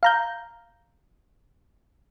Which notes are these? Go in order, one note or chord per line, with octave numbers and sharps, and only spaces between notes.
F5 A#5 G6